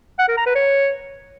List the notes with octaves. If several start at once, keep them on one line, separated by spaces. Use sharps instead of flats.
F#5
A#4
A#5
B4
C#5